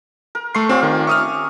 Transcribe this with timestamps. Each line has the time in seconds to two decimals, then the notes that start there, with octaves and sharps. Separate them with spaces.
0.35 A#4
0.55 A3 C6 C#6 C7
0.69 C4 C#4 F4 G4
0.83 D#3
1.07 E5 C#6 D#6 F6